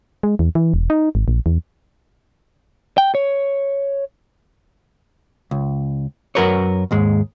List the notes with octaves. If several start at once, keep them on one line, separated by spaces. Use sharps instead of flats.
G#3
E2
E3
E1
D#4
G#1
A#1
E2
G5
C#5
C#2
F#2 D#3 F#4 A#4 B4 C#5
D#2 G#2 G#3